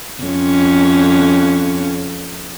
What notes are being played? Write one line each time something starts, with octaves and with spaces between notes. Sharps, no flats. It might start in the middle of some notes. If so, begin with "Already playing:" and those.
F2 C#4